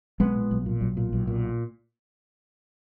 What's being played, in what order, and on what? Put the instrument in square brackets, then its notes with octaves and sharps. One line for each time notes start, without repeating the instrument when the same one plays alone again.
[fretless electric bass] B1 G#3 B3
A#2
B1
A#2
B1
A#2
B1
A#2